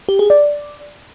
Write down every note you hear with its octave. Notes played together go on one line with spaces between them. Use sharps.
G4
G#4
D5